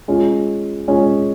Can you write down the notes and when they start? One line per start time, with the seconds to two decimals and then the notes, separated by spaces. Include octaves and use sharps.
0.08 G#3 C#4 F4
0.88 G#3 C#4 F4